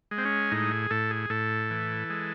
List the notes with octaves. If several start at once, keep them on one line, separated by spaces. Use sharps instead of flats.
G#3
C4
C#4
A2 D#4
G#4
A2 A4
G#4
A2 A4
E3
G#3